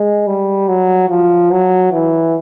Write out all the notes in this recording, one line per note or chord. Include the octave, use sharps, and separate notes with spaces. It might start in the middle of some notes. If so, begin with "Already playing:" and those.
Already playing: G#3
G3
F#3
F3
F#3
E3